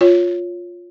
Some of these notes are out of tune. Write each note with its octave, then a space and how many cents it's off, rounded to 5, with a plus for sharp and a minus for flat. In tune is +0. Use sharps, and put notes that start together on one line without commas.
F4 +10 C#5 +0